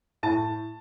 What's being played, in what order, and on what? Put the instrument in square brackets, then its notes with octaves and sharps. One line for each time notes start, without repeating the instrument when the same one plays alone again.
[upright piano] A2 A5